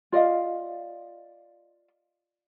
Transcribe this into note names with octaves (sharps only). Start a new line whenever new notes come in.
F4 D5 D#5 F5